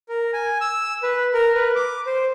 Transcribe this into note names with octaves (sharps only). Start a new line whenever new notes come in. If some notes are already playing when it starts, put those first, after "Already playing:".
A#4
G#5
E6
B4
A#4
B4
D6
C5